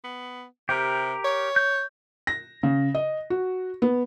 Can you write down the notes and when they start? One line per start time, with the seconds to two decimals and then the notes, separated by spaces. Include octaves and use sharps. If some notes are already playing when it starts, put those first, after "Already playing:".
0.04 B3
0.69 C3 G4 A#4
1.24 C#5
1.56 G6
2.27 A#6
2.63 C#3
2.95 D#5
3.30 F#4
3.82 B3